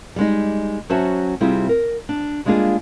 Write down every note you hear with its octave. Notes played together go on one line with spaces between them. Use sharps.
G3 G#3 D#4
F#3 C#4 F#4 C5 E5 A5
C3 G3 C4 E4 F4 G#4
A#4
D4
G3 G#3 A#3 D4 F4 G#4